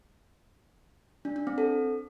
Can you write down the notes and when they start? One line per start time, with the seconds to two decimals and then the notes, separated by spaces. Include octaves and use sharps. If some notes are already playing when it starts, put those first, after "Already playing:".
1.25 D4
1.36 D4
1.47 C4
1.58 A4